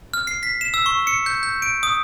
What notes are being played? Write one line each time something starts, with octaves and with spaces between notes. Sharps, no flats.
F6
C7
B6
E7
E6
C#6
C#7
G6
G6
D7
D#6